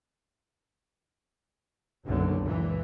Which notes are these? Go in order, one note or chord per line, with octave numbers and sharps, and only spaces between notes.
F#1 B1 F#2 D3
C#2 A#2 E3